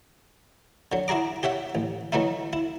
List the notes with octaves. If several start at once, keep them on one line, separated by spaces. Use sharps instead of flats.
D3 F#3
E4 F#4 G#4 A#5 D6
G4 C#5 E5 F#5
A1
E3 F#3 A3 D#4 E4
E4